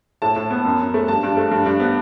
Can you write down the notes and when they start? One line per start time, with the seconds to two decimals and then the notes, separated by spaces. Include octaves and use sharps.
0.22 A2 A5
0.36 A2
0.51 B3
0.65 F#2
0.79 F#2
0.94 A3
1.08 G2 A5
1.23 G2
1.37 A3
1.51 G2
1.66 G2
1.80 B3